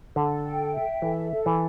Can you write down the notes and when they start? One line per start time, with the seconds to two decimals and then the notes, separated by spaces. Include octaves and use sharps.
0.16 D3 A4
0.45 G5
0.74 E5
1.02 E3 A4
1.31 A4
1.46 E3